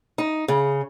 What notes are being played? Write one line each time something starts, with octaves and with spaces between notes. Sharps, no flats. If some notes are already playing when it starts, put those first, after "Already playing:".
D#4
C#3